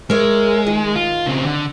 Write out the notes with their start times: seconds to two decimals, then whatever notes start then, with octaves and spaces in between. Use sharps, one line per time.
0.10 G#3 A#4 C#5 E5
0.67 D#3
0.95 F4
1.27 C#3 C4
1.45 D3